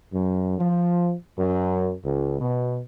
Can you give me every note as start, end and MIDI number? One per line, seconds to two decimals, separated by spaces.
0.13 0.56 42
0.58 1.13 53
1.37 1.92 42
2.04 2.39 37
2.40 2.79 47